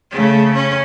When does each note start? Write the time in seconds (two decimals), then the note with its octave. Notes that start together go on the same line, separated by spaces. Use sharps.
0.11 C#3 A3
0.54 C#4